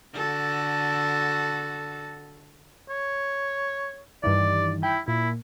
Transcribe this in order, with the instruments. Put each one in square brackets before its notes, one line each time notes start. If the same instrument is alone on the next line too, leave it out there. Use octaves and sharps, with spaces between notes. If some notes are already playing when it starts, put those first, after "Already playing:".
[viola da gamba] D3 F#4 A4
[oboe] C#5
[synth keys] G2 D#3 E3 [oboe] D5
[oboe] E4 [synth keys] G5
[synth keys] A#2 [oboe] E4